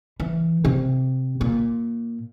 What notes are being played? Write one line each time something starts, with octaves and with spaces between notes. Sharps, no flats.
E3
C3
A#2